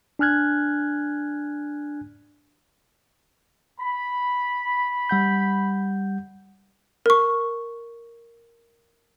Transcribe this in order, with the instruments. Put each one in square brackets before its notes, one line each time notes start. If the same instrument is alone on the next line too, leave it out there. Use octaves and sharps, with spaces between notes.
[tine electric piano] D4 G#5 F6 F#6 G#6
[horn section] B5
[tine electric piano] G3 F#5 G6
[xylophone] A#4 C#6